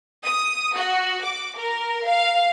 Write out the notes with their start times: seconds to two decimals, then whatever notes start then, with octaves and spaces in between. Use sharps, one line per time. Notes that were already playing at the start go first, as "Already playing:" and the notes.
0.25 D#6
0.75 F#4
1.24 D6
1.58 A#4
2.05 F5